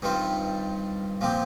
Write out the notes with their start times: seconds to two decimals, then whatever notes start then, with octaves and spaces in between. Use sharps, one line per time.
0.02 G2 D#3 G3 C4 F4
1.21 A#2 F3 C4 G4